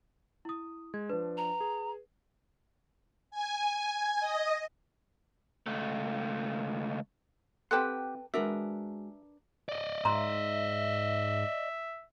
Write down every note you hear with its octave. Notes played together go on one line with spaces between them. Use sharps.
E4 D#6
G#3 G#6
F3 D4 B4
A#5
G#4
G#5
D#5
C#2 A3
C4 G4 A4 B4 F#5 G5 A5 C6
G#3 D4 F#4 A#4 B4 E5
D5 D#5
G#2 E5 A#5 C6